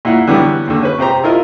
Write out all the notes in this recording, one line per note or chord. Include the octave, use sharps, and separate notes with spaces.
A#2 E4 F#5
D3 E3 F#3 G3 B3
D#2 D3
C#4 B4
C3 G4 C5 A#5
E4 F4 A#4 D#5